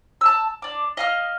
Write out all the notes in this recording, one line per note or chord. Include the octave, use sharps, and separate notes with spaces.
A5 E6
D4 D6
D#5 F5 F6